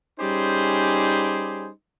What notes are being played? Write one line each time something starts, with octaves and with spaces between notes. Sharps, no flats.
G3 C#4 D#4 G4 G#4 C5